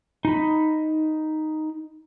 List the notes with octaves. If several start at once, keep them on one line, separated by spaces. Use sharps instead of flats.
D#4 B5